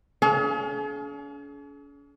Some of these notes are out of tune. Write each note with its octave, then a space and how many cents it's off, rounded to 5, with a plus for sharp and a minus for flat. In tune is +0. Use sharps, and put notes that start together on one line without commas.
C#4 +45 G#4 +45 F5 +5